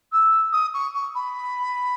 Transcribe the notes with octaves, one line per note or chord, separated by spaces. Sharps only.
E6
D#6
C#6
C#6
B5